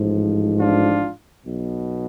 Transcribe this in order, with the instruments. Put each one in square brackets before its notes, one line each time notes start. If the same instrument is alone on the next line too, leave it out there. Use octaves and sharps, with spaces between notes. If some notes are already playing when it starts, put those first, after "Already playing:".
Already playing: [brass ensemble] A1 G#2 F3
D4 F4
B1 B2